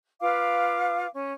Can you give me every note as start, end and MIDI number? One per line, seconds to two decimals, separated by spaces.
0.21 1.06 65
0.21 1.06 71
0.21 1.06 77
0.21 1.06 86
1.12 1.33 61